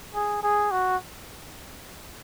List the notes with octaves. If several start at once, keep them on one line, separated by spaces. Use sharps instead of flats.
G#4
G#4
F#4